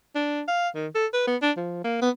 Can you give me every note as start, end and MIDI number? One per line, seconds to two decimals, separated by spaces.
0.15 0.42 62
0.48 0.68 77
0.75 0.88 51
0.95 1.06 69
1.14 1.25 71
1.27 1.37 59
1.42 1.51 62
1.57 1.83 53
1.84 2.01 58
2.02 2.10 59